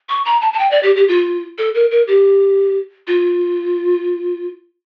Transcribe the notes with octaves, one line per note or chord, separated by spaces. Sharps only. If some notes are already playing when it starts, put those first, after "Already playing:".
C#6
A#5
A5
A5
G5
D5
G4
G4
F4
A4
A#4
A#4
G4
F4